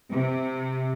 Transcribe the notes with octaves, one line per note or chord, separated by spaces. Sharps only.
C3